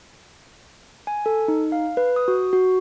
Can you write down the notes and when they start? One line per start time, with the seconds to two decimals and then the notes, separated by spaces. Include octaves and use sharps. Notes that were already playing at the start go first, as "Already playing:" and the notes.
1.07 G#5
1.26 A4
1.48 D#4
1.72 F5
1.97 B4
2.16 D#6
2.28 F#4
2.53 F#4